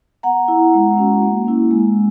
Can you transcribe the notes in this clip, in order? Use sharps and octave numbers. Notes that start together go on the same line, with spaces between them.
B3 F#5 A#5
E4
G#3
C#4 F#4
A#3
C#4 E4
G#3